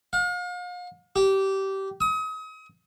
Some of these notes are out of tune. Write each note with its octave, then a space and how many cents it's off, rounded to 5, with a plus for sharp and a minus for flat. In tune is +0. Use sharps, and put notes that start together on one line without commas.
F5 +40
G4 -20
D#6 +35